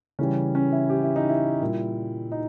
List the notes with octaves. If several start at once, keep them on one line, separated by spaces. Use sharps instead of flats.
C#3 E3 G3 C#4
C#4
E4
G4
E4
D#4
E4
A#2 G3
D#4